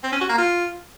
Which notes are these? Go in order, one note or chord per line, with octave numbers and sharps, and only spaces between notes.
C4
C#4
F#4
A#3
F4